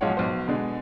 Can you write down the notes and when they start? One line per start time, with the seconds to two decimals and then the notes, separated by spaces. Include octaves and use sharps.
0.01 B1 F3 G#3 F4 C#5 F#5
0.17 B1 B3 C5
0.48 B2 D3 G#3